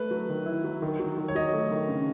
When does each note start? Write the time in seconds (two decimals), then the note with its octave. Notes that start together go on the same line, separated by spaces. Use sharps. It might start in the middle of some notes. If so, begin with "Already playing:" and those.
Already playing: A3 B4
0.11 F#3
0.29 D#3
0.46 E4
0.64 F#3
0.82 D#3
1.00 F#3
1.18 D#3
1.28 C#5
1.35 F#3 D#5
1.53 A3
1.71 D#3
1.88 C#3